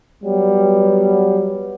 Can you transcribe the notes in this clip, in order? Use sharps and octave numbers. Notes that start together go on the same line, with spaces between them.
F#3 G3 B3